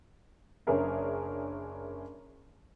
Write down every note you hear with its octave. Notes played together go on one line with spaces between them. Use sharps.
F#1 C#4 D4 G#4 A#4 E5